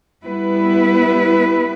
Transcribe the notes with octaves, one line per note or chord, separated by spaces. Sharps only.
G3 B3 E4 B4